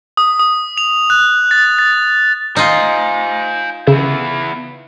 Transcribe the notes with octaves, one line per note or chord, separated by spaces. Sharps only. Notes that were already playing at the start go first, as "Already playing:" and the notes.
D#6
D#6
F7
F#6
A6
A6
D#4 F4 C5 G#5
C#3 B3 E4